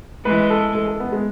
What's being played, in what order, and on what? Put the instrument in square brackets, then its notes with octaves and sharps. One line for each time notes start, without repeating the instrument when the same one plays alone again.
[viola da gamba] E3 G#3 [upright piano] B4
[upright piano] A4
A4
A4
B3
G#3